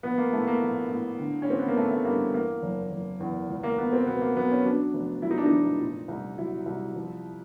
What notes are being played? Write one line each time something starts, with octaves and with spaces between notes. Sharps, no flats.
A#1 B3
A#3
A2 A3
A#3
A#1
A2
D3
C#4
A1 C4
B3
A#3
A1 A3
A3
G2 A#3
E2 A#3
F#1
F#1
E2
C#2
A#3
C#2 B3
C4
B2 B3
A#3
F#3 B3
C#4
F#3 D4
F1
F#3 E4
D#4
D4
D#4
F1
A#2
C2
F#3 E4
C2
F3